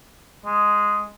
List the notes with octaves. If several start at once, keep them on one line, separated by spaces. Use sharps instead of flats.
G#3